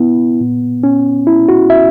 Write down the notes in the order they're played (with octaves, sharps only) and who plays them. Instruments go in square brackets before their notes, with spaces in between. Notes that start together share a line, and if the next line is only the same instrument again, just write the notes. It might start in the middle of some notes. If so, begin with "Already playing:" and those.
Already playing: [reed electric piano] B2 B3 E4
A#2
C#4
E4
F#4
E5